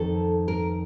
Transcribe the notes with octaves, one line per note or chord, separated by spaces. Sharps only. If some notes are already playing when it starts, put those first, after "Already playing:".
Already playing: F2 D#3 A4
A#4